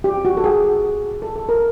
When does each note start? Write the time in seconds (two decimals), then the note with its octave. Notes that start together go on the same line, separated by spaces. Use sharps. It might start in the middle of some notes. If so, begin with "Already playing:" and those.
0.04 G4
0.25 F#4
0.37 A4
0.44 G#4
1.22 A4
1.36 A4
1.49 A#4